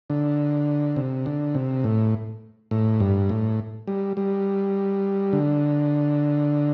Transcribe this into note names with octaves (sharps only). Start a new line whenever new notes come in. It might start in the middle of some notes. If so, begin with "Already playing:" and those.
D3
C3
D3
C3
A2
A2
G2
A2
G3
G3
D3